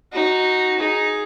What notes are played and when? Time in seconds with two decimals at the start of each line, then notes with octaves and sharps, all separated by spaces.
0.13 D#4 F#4
0.79 D#4 G#4